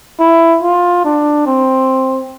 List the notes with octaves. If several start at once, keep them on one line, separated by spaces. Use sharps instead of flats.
E4
F4
D4
C4